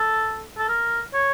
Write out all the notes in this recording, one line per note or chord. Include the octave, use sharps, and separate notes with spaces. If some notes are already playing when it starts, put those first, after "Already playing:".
Already playing: A4
A4
A#4
C#5